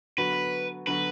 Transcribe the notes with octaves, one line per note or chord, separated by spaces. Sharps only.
D3 F#3 B3 F#4 B4
D3 F#3 B3 F#4 B4